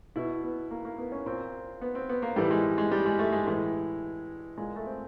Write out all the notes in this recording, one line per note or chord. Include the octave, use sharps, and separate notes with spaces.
B2 E4
B3
A#3
A#3
B3
C#4
A#2 C4
B3
C4
B3
A#3
A2 E3 G3
G#3
G#3
G3
G#3
A3
G#3
A2 E3 G#3
A#2 G#3
A3
C4